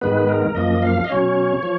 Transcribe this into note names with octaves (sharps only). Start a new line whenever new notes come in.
G#2 D#3 G#3 B3 B4
A#4
F#2 F3 A#3 D#5
F5
D#5
B2 F#3 C#4 C#5
F3